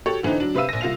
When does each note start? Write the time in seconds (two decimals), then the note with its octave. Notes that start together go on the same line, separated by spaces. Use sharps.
0.06 F#4 G4 A4 C#5
0.23 D3 E3 C4 D4 D#4
0.40 F#3 D4
0.55 C3 B4 E5 F5 E6 D#7
0.69 A#1 A#6
0.81 C2 F4 F5 F7